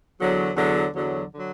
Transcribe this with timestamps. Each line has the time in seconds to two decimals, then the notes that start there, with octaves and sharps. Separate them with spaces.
0.20 E2 D3 F#3
0.56 E2 D3 F#3
0.94 E2 D3 F#3
1.32 D3 F#3